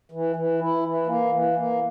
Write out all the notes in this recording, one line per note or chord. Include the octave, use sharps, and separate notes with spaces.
E3
E3
E4
E3
A#3
E3
A#3